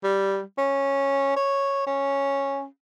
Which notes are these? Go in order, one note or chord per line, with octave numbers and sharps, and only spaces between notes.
G3
C#4
C#5
C#4